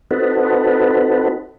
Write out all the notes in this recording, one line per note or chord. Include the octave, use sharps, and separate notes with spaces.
C4 D#4 F#4 A4 B4